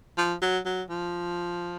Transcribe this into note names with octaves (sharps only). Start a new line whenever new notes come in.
F3
F#3
F#3
F3